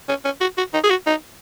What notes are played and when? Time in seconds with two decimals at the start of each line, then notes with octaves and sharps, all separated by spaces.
0.09 C#4
0.25 C#4
0.41 F#4
0.58 F#4
0.74 D#4
0.84 G#4
0.90 F#4
1.07 D#4